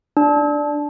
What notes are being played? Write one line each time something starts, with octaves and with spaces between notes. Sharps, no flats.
D4